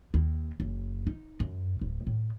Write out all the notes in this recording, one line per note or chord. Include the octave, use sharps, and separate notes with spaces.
D#2
F#1
D#4
F#2
D1
A2